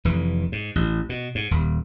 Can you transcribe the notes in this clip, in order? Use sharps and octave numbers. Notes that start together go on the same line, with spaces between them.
F1 E3
G#2
A1
B2
G#2
D#1